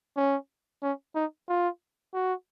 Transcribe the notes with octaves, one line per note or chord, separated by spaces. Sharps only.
C#4
C#4
D#4
F4
F#4